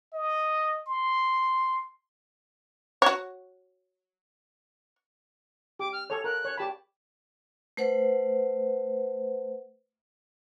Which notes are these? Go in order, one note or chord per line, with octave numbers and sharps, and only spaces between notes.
D#5
C6
F#4 C#5
G4 D6
F6
A4 C#5 F7
A#4 F#6
C#5
G4 A5 B5
A3 B4 C5 F#5